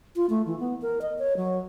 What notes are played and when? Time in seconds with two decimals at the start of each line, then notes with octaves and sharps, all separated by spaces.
0.16 F4
0.30 A3
0.46 E3
0.60 B3
0.82 A#4
1.02 D#5
1.19 C#5
1.37 F#3